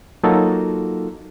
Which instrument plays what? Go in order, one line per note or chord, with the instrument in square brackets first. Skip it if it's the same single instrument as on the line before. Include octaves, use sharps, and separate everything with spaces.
[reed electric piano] F#3 A#3 D#4 F4 F#4 A4